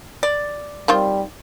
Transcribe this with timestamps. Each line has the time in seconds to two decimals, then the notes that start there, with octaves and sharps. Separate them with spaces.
0.23 D5
0.88 D#3 G3 C4 F4